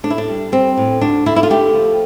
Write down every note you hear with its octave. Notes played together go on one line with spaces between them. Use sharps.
A2 D4
E4
D4
G3
G3 C4
A2
D2 D4
D3 E4
E4
F4
A3 G4
F3